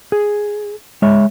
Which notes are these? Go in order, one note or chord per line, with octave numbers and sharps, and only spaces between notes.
G#4
G#3 C#5 E5